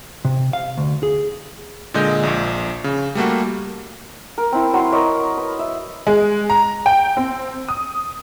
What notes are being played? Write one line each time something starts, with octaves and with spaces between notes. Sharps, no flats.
C3
F5
D2
G#4
A#2 D3 G#3 D#5 G6
A#1 A#2
C#3
G3 A3 A#3 F#4
A#4
C4 E4
F#3 C6
A#4 C#5 D#5 B5
B4
E5
G#3
A#5
G5
C4
D#6